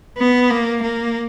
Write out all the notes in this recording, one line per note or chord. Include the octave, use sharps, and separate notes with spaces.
B3
A#3
A#3